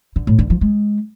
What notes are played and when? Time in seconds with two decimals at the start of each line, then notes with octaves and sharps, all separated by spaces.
0.16 D3
0.27 A2
0.39 D3
0.50 F3
0.61 G#3